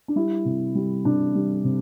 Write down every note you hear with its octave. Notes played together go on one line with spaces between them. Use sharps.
D4
G3 E4
C3
G3
C3 D4
G3
C3